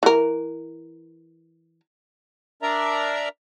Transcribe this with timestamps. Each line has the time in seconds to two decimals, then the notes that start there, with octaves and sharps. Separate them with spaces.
0.03 E3 A#4
2.62 D4 A#4 D5 E5 A#5